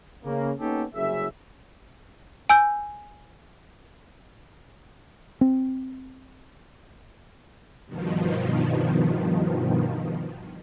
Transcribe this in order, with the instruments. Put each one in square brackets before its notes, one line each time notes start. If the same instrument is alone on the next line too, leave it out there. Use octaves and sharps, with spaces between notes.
[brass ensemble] C#3 A#3
A#3 B3 C#4 D#4 G4 A4
F#1 C2 F#2 G#4 E5
[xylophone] G#5 E6 G6
[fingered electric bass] C4
[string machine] G2 B2 D#3 F3